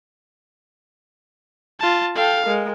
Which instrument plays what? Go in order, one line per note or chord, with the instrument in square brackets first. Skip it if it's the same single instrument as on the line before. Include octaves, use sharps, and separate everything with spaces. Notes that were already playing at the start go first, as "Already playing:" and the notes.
[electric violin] F4 A5
[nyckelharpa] A4 G5 [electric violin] F5
[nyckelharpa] G#3 A#4